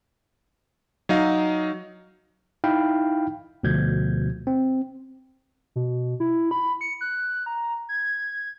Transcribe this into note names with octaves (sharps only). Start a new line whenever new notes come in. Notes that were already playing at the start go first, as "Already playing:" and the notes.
F#3 D#4 F5
D#4 E4 F5 G5 B5
D2 B2 F3 G6 G#6
C4
B2
E4
B5
C#7
F#6
A#5
G#6